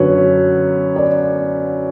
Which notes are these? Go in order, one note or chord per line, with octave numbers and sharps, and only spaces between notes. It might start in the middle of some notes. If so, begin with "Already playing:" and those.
Already playing: F#2 D3 F#3 B4 C#5
D5